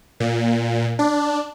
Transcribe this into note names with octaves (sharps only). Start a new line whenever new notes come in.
A#2
D4